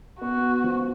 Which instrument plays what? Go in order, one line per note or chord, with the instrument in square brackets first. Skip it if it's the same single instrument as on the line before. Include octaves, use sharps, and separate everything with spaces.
[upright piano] B3 [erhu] F#4
[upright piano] F3